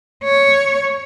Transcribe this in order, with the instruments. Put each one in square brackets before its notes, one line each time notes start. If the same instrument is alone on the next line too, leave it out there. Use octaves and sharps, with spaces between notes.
[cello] C#5